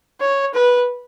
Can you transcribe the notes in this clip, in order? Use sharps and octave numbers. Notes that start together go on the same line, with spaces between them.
C#5
B4